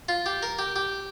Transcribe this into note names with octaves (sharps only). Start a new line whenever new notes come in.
F4
G4
A#4
G4
G4